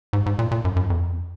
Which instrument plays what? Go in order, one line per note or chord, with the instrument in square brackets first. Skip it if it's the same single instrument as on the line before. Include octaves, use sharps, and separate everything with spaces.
[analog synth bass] G#2
G#2
A#2
A#2
F#2
F#2
F2